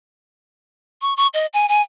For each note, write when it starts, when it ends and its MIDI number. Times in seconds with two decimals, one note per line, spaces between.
1.02 1.14 85
1.17 1.27 85
1.34 1.46 75
1.54 1.68 80
1.69 1.82 80